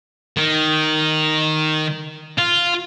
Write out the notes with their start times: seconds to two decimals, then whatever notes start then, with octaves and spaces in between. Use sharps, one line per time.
0.37 D#3
2.38 F4